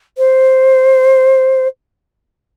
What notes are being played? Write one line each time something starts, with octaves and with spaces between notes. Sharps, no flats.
C5